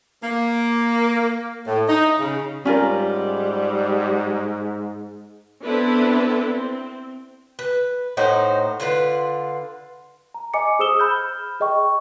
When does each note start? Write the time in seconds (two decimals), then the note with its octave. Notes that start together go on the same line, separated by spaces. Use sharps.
0.24 A#3
1.67 A2
1.89 D#4
2.20 C#3
2.65 G#2 G3 C#4 F4 A#4
5.64 B3 C4 D4 E4 A4 B4
6.52 C4
7.59 B4
8.17 A2 D#4 F#4 C5
8.80 D3 F4 A#4 B4
10.34 A#5
10.54 D#5 G#5 D6 C#7
10.79 G#4 C5 D#6 E6 E7 G7
10.99 B5 F6 G6
11.60 G#4 D#5 G5 C#6